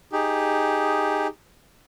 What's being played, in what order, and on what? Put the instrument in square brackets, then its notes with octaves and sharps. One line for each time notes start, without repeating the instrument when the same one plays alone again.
[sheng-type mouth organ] D#4 G4 G#4